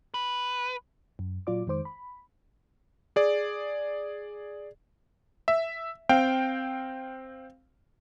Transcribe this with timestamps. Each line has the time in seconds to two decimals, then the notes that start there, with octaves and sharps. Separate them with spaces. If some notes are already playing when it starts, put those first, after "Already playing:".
0.14 B4
1.19 F#2
1.47 A#2 F#3 F4 D5 D6
1.67 F2 D#3 G#3 C5 D6
1.85 B5
3.16 G#4 D5
5.48 E5
6.09 C4 F5 G5